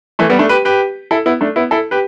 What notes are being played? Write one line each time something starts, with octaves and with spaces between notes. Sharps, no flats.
E3 A3
G3 B3
A3 D4
G4 B4
G4 B4
E4 A4
B3 E4
A3 D4
B3 E4
E4 A4
G4 B4